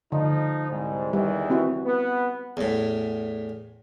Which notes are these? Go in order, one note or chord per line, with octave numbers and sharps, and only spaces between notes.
D3 F3 D#4
C2 G#2
E2 D#3 E3 G3
C4 E4 F#4
B3
E2 A2